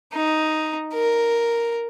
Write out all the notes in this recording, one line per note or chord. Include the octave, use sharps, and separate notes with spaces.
D#4
A#4